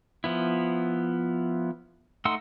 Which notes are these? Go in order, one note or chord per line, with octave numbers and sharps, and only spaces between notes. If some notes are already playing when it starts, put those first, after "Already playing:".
F3 B3 E4
A3 D#4 F#5 C6 E6